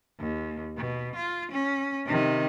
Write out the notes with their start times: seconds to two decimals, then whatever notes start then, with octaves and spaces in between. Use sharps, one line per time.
0.19 D#2
0.76 B2
1.15 F4
1.51 C#4
2.06 C3 D#3